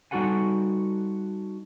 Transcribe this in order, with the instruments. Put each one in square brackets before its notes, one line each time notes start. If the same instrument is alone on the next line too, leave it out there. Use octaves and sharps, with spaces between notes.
[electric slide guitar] G3 D#4 F#4 A4 F#5 G#5